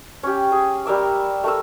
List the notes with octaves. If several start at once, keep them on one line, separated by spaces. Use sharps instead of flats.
C#4 G4
G#4
G3 A#4 E5 D6
A3 A#4 E6